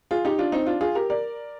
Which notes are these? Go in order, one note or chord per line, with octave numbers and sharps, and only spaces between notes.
F4 G#4
D#4 G4
D4 F4
C4 D#4
D4 F4
F4 G#4
G4 A#4
A#4 D5